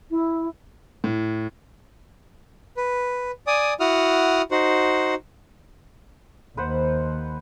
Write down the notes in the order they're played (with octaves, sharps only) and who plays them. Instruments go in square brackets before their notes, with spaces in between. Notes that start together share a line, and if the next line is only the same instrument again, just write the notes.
[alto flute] E4
[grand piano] A2
[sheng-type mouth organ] B4
D5 G#5 D#6
E4 F#4 F#5 D#6 F6
D#4 F#4 C5 F#5
[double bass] D#2 [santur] B4 C5 F#5